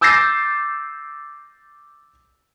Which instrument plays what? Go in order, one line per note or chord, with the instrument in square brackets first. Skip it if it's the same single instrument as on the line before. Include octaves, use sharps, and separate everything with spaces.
[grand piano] D6 E6 G6 A6 A#6 C7